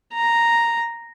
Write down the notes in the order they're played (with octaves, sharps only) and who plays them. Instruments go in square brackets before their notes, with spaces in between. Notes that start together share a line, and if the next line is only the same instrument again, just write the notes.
[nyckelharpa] A#5